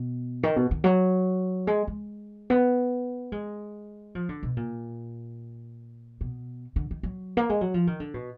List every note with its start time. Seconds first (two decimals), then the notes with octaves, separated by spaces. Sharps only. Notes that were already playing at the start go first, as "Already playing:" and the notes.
Already playing: B2
0.43 D#3
0.56 B2
0.71 D#3
0.84 F#3
1.67 G#3
1.87 G#3
2.50 B3
3.32 G#3
4.15 F3
4.29 D3
4.43 B2
4.57 A#2
6.21 B2
6.76 D3
6.91 D#3
7.03 F#3
7.37 A#3
7.50 G#3
7.61 F#3
7.74 F3
7.87 D#3
8.00 D3
8.14 B2